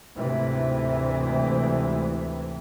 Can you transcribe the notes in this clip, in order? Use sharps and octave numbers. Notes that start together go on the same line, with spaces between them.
D2 G#2 C3 E3